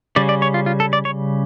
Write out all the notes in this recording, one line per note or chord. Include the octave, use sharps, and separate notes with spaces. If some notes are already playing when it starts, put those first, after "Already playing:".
C#3 G3 C#4 D5
D5
C#5
F4
F4
A4
D5
C#5